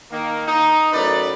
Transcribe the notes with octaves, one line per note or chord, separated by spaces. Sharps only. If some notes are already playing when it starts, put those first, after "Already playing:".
D#3 A#3
D#4
F#2 A2 B4 D5